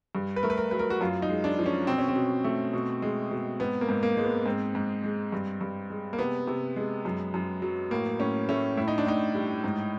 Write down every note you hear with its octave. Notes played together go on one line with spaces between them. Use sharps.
G2
B4
A3 A#4
B4
A#4
F#3 B4
A#4
F#4
F#2 F4
D#4
G#3
D4
F3
C#4
B2 C4
C#4
C4
B2
A3
B2
G#3
B2
G#2 B3
A#3
G#2
A#3
G#3
B3
G#2 C4
G#2
G#3
G2
G2
G#3
A#3
C3 B3
C3
G#3
F#2
F#2
F#3
A2 A#3
A2 C#4
A3 C#4
A2 E4
D#4
D4
A2 D#4
G3
G#2